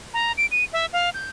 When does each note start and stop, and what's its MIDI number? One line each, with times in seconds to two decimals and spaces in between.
0.14 0.32 82
0.37 0.46 98
0.51 0.64 99
0.73 0.86 76
0.93 1.09 77
1.14 1.30 91